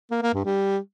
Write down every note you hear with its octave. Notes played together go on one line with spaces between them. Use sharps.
A#3
A#3
G2
G3